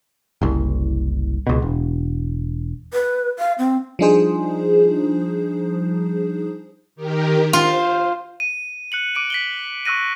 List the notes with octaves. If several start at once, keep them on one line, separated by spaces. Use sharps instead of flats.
F#1 C2
C#2 B2
E1
B4
F5
C4
F3 G3 D4 D#4 G#4 C5
D#3 G4 A#4
F4 C5
D#7
F#6 C#7 F#7
D6 D7 D#7
B6 F#7 G7
C#6 E6 F#6 A#6 D#7